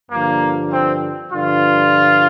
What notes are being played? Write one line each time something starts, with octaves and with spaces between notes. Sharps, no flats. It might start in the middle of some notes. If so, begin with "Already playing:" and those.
G2 D3 F3 A#3
C4
G2 D3 F3 F4